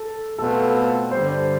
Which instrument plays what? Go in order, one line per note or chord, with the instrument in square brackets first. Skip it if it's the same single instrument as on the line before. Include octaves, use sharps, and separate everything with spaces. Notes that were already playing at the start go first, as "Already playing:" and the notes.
Already playing: [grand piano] A4
[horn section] B2 A3 C4 F4 [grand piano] A4
[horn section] G2 D3 G3 [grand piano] C5